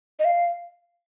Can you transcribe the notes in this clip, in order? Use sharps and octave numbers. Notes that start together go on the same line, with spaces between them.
D#5
F5